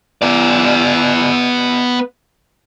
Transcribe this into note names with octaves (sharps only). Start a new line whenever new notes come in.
B3 D5